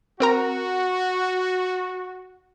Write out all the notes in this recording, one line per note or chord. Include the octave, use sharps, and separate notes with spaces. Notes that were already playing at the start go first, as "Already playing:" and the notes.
C4 F#4 A#4 A#5